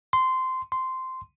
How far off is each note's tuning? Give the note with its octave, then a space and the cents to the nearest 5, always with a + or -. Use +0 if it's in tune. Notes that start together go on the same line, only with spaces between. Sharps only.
C6 -15
C6 -10